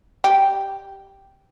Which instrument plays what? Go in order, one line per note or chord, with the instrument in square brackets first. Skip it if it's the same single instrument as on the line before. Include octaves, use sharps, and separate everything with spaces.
[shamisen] G4